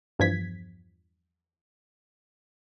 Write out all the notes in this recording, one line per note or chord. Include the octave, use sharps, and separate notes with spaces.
E2 G2 F3 G#6 B6